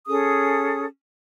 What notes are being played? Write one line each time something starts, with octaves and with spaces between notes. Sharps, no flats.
C#4 G#4 A4 D#6